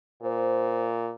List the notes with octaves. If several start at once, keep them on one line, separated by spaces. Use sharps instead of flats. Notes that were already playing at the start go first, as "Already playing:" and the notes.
A#2 C5